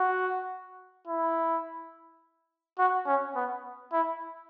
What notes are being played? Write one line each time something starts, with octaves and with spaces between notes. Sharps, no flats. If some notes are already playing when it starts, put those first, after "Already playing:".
Already playing: F#4
E4
F#4
C#4
B3
E4